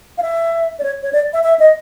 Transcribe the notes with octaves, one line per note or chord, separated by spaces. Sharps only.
F5
E5
D5
C#5
C#5
D5
E5
E5
D#5